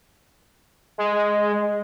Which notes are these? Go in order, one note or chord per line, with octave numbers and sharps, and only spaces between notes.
G#3